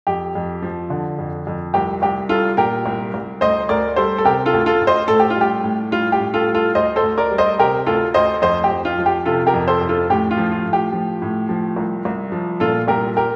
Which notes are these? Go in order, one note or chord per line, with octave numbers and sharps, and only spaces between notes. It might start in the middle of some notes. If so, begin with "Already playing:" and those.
F2 G4
F2
F3
D3
F2
F2
C2 G4
C2 G4
G3 F4 A4
A#2 G4 A#4
C2
C2
D2 C5 D#5
D2 A#4 D5
G3 A4 C5
A4
C3 G4 A#4
F4 A4
D2
F4 A4
D2
C5 D#5
A2 A4
G4
F4
G3 G4
A2
G3 F4
G4
A2
F4 A4
G3
F4 A4
D2 C5 D#5
A4 C5
D2
A#4 D5
G3
C5 D#5
C3 G4 A#4
D2 F4 A4
D2 C5 D#5
F2 C5 D#5
G4
F2
F4
F3
G4
C3 F4 A4
G4 A#4
F2
A4 C5
F2
F4 A4
A2 G4
F4
F3
F4
A2
G4
F3
A2
F3
C2
C2
F3
A#2 F4 A4
C2 G4 A#4
G4 A#4